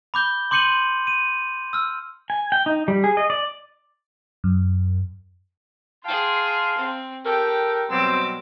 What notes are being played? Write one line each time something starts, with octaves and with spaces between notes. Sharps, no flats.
B5 D6 G6 G7
C6 D6 G6 C#7 D#7 F#7
D#7
E6 F6
G#5
G5
D#4
G3
G#4
D#5
D5
F#2
G#4 F5 G5 A5 C6
C4
G4 A4 A#4 G5
B2 F#3 G3 C4 D6 E6